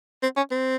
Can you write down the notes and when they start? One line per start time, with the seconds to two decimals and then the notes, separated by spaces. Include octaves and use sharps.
0.23 C4
0.37 C#4
0.51 C4